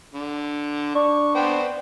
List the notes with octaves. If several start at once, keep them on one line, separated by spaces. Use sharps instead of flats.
D3
D4 C#6
B3 C5 G5